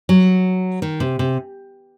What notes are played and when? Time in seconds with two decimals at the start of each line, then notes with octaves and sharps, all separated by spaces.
0.09 F#3
0.82 D#3
1.00 C3
1.19 C3